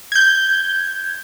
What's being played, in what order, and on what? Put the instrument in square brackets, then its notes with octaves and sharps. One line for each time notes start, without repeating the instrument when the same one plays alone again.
[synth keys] G6 G#6